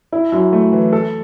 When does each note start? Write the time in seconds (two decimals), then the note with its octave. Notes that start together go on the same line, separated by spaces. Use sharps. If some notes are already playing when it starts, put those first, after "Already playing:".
0.12 E4
0.32 F#2
0.53 A3
0.73 E3
0.93 A4